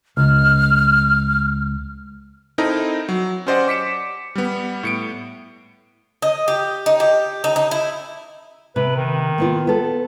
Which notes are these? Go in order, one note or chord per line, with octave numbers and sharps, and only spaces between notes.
C#2 F6
C4 D#4 E4 A4 A#4 D#5
F#3
C#4 G4 C5 D5 D#5 F#5
D6 B6 C#7 E7
G3 B3
A2 C#7 D7
D#5
G4
D#4
G4
D#4
D#4
E4
C3 B4
D#3
A#3 B3 F4
B3 A4